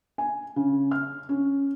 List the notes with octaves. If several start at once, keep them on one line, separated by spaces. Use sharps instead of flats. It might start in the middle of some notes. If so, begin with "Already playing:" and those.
G#5
C#3
F6
C#4